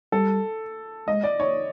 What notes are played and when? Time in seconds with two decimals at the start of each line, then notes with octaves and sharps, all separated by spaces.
0.12 G3 A4
1.08 G#3 D#5
1.24 D5
1.40 C#5